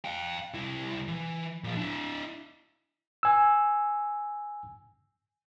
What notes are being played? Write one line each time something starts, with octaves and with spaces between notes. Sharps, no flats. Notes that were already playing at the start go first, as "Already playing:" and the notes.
F5 G5
C2 E4
E3
A#2 F3
D4 E4
G#5 E6